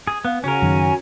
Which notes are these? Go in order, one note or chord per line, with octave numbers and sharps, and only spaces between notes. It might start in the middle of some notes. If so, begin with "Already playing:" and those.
G#4
B3 F5
C#3 C#4 F#4 A#4 G#5
F#2 D#3